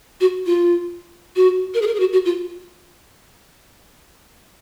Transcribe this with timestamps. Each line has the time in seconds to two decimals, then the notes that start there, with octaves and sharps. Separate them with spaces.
0.21 F#4
0.46 F4
1.36 F#4
1.74 A#4
1.82 G#4
1.87 A#4
1.95 G#4
2.00 F#4
2.13 F#4
2.25 F4